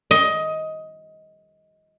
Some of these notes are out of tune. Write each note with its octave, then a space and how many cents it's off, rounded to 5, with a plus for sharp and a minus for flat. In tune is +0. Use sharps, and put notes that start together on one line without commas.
D#5 +15